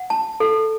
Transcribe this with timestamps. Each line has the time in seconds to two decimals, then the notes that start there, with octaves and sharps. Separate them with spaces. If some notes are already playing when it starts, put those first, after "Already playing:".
Already playing: F#5
0.10 A5
0.40 A4